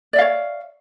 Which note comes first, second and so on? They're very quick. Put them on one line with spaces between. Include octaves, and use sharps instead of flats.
D5 E5 F5 C#5